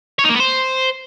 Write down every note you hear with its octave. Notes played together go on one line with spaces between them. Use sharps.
C#5
D#4
A#3
B3
C5